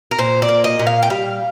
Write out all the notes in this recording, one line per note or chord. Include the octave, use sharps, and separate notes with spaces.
A#4
A#2 C5
D5
A#3
D#5
A#2
F5
G5
G3 F5